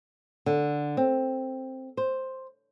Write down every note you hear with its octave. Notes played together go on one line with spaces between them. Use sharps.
D3
C4
C5